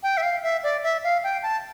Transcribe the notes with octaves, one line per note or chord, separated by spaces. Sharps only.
G5
E5
F5
E5
D5
E5
F5
G5
A5